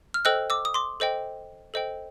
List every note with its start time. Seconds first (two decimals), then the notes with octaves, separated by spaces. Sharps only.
0.14 F6
0.25 A4 C5 D#5 G5 E6 F#6
0.50 D6 E6
0.65 D#6
0.74 C6 D6
1.00 A4 C5 D#5 G5
1.74 A4 C5 D#5 G5